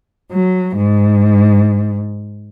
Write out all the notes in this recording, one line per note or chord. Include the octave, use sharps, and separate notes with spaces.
F#3
G#2